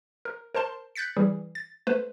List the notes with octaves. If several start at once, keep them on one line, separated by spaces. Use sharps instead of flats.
A#4
A#4 C5 A5 C6
F#6 G6 A6 B6 C#7
E3 G3 G#4
A6
A3 B4 C5